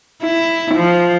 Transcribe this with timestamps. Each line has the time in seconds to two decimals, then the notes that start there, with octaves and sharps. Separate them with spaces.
0.23 E4
0.75 F3